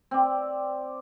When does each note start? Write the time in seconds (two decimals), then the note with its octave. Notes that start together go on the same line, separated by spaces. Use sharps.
0.11 C4 D5